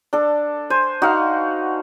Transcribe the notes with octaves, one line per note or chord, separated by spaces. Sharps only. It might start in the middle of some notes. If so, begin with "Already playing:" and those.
D4 A4
C5 G#5
D#4 F#4 F5 F#5